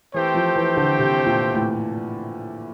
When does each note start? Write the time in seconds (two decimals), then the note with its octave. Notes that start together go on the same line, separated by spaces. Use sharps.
0.14 E3 A3 C4 G4 C5 G5
0.35 F3
0.56 E3
0.77 D3
0.99 C3
1.26 A#2
1.54 A2